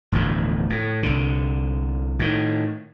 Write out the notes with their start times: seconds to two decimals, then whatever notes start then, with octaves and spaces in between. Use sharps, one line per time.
0.12 E1 D2 A2 F3
0.70 A2
1.03 C2 D3
2.19 A2 D#3